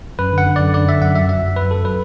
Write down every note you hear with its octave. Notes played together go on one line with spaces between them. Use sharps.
F#2 B4
D3
F#5
D3
F#2 D5
D3 D5
D3 E5
F#2 F#5
F#3 E5
F#3 E5
F#2
F#2 B4
F#3 A4
F#3 B4